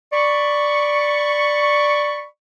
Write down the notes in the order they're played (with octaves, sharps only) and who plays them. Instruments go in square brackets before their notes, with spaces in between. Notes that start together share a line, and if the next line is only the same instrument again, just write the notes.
[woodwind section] D5 B5 C#6